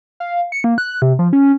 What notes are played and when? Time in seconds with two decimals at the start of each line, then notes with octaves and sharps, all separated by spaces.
0.20 F5
0.52 C#7
0.64 A#3
0.78 F#6
1.02 C3
1.19 F3
1.33 C#4